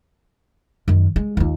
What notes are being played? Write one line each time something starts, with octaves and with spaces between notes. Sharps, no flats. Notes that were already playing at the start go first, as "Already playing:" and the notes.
F#2 D#3
G#3
D#2 F4